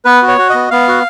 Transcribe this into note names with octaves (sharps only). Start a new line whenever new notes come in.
B3 B4
F#4
C#5
F#4
B3 D#5
B3 F5
F#4